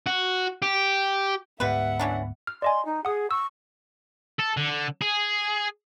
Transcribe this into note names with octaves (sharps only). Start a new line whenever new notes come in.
F#4
G4
D2 G#2 G3 B3 B4 E5 F#5
E3 C#4 D4
F6
D5 D#5 G#5 C6
D#4
G#4 F#5 D#6
C#6 E6
A4
D3
G#4